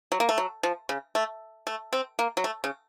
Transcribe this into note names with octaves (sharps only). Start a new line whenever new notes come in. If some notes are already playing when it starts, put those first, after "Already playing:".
F#3
A#3
A3
F#3
F3
C#3
A3
A3
C4
A#3
F#3
A3
C#3